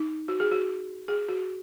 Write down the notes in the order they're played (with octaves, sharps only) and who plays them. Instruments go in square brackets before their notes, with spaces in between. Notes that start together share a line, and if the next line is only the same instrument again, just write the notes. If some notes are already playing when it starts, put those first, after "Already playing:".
Already playing: [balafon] D#4
F#4
G#4
F#4
G#4
F#4